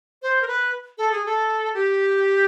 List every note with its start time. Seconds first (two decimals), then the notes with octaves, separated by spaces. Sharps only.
0.22 C5
0.42 A#4
0.48 B4
0.98 A4
1.12 G#4
1.26 A4
1.74 G4